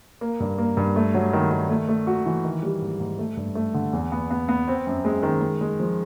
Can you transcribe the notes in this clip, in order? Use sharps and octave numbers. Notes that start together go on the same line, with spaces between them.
A#3
G2
A#3
G2
A3
F#3
D#3
D#3
A3
A3
F#4
E3
D#3
G3
G#2
G#2
A3
G2
A3
D3
E2
B3
B3
B3
C4
F#2
G#3
D#3
G#3
G#3
F3